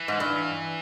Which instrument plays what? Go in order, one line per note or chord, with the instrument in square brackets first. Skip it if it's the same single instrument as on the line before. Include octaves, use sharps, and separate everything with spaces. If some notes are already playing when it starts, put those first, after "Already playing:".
Already playing: [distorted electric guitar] E3
[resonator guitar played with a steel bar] G#2
G2